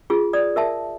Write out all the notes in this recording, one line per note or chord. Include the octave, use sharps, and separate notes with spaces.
F4 G#4
D5 D#6
A#4 E5 A5